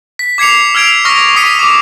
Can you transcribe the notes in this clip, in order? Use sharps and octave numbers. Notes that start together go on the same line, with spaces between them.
B6
D6 G#6 C7 C#7 F7
E6 F6 G#6 D7 F7
C#6 D#6 F6 A#6
C#6 D#6 B6 C#7 D#7
D6